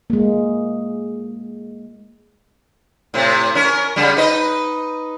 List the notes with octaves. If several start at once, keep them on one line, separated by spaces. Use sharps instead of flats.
G#3 A#3
A2 C3
C#4 A#4
C#3 G3
D#4 B4 D#5